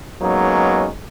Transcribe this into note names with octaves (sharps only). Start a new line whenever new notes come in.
F#3 G#3 A#3 B3 C#4 D#4